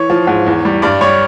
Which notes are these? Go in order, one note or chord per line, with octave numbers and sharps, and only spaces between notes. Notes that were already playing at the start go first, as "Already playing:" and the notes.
Already playing: E3 C#5
F3
G#2
E2
G3
G2 D5
G3 C#5